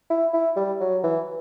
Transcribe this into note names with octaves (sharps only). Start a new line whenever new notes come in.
E4
E4
G3
F#3
E3